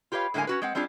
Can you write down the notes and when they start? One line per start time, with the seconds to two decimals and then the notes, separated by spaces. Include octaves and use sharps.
0.12 F4 G4 B4 C#5 F5
0.34 A2 D3 G#3 A#3 G#5
0.47 C#4 F#4 B4
0.62 G#3 C4 F#5
0.75 G3 C4 D4 F4 G#4